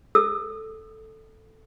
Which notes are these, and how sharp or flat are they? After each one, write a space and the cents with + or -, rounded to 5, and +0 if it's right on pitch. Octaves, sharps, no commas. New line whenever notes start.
A4 +0 E6 +0